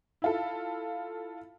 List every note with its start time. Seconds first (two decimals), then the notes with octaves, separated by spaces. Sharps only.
0.22 E4 F4 A4